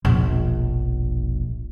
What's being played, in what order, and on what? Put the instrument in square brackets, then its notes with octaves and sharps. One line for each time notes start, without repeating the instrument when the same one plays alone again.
[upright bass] E1 A#1